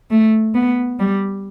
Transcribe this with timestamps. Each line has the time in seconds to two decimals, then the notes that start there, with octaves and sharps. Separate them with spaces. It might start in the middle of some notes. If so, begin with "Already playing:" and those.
0.11 A3
0.55 B3
0.99 G3